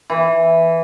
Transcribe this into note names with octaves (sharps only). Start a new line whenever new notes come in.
E3